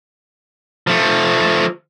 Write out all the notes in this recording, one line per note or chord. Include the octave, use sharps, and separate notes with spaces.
F3 A3